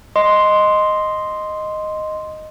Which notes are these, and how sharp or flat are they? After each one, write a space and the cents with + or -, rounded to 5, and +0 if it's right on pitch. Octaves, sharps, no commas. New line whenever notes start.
D#5 +0 C6 +0